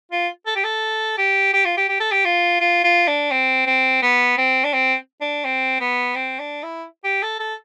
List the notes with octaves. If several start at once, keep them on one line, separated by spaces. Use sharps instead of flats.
F4
A4
G4
A4
G4
G4
F4
G4
G4
A4
G4
F4
F4
F4
D4
C4
C4
B3
C4
D4
C4
D4
C4
B3
C4
D4
E4
G4
A4
A4